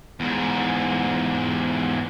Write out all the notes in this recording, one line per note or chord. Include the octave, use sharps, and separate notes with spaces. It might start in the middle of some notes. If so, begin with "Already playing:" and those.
E2 G#2